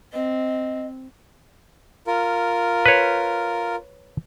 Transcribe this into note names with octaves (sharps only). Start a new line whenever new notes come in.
C4 D#5
F4 A#4
B4 C#5